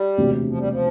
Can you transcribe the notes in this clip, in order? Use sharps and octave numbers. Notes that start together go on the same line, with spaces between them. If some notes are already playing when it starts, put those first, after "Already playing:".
Already playing: G3
E1 D2 C3
F3
G3
F3